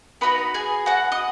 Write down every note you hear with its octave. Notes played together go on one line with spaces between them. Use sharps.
B3 D#4 F#4 B4 B5
G#4 G#5
F#4 F#5
D#5